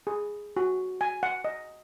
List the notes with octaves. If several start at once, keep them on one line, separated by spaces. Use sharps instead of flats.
G#4
F#4
G#5
F#5
D#5